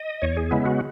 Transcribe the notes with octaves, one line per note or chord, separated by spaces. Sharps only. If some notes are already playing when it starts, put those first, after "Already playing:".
Already playing: D#5
E2 C#5
G#4
C#3 G#3 B3 E4
F#4